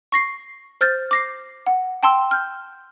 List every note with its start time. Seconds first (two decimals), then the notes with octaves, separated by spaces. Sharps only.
0.12 C#6 A#6 C7
0.81 C5 F6 G6 A6
1.11 D6 A#6 C7
1.66 F#5
2.03 G5 A5 C6 E6
2.31 F6 G6